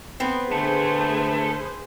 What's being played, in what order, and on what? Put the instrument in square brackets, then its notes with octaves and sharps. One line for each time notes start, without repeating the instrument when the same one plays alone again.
[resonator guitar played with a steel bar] B3 C4
[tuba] D3 [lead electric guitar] A3 [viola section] G#4 B4 C5